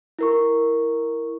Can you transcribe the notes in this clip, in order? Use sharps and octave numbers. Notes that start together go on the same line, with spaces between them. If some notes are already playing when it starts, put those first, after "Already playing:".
E4 A#4 C#6